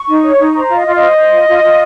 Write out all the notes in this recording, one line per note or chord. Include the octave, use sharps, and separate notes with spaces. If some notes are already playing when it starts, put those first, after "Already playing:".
Already playing: C#6
D#4
C#5
D#4
C5 A#5
F4
D#5
F4
D#5
C5
C5
F4
F4
F4